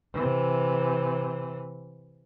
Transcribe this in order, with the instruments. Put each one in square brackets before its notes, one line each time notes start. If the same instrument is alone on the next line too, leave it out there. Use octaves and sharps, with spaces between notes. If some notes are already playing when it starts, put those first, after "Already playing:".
[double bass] C3 E3